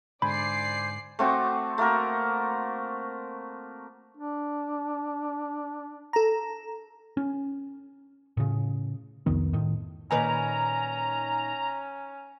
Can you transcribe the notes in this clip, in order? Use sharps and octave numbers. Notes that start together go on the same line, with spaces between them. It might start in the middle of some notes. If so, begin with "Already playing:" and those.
G#2 D3 C5 D5 G#5 B5 C7
A3 C4 F#4 D6
A3 A#3 F#4 A#4
D4
A4 A#5
C#4
A2 C#3
C2 F2 D#3 B3
A2 D#3
A#2 D#3 C#4 B4 G#5 A#5